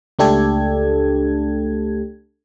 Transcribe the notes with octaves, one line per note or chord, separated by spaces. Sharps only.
C#2 A3 D4 G4 A4 G#6